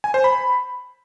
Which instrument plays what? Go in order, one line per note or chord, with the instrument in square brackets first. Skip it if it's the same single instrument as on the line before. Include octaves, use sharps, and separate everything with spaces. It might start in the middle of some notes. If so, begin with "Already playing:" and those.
[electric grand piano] G#5
C5
B5